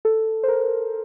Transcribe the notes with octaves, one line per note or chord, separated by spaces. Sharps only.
A4
C5
A#4